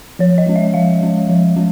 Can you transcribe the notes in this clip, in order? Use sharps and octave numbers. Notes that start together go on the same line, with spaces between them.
F3 C#5
D#5
G#3 C#4
E5
F3 F5
G#3 C#4
F3
G#3 C#4